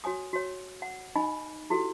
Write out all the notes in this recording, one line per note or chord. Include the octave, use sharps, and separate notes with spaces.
F#4 C#5 G#5 D#6
F#4 C#5
F#5
D#4 D#5 G#5 B5
E4 F#4 G4 A4